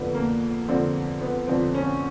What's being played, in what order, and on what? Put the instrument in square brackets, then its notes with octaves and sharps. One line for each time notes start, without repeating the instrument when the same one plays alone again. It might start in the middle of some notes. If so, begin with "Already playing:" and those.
Already playing: [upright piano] F2 D3 F3 B3
A#3
F2 D3 F3 C4
B3
F2 D3 F3 C4
C#4